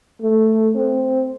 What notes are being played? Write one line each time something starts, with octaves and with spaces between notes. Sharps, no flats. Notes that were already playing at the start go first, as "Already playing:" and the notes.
A3
C4